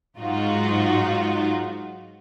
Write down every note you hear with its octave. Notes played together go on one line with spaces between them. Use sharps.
G#2 F#3 D#4 F4 F#4